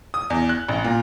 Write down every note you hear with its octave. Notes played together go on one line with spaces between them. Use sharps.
D#6
E2
F#6
A1
A#2